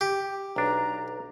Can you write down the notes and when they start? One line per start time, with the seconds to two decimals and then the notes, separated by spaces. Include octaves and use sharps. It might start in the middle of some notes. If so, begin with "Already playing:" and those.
0.01 G4
0.56 B1 D4 A#5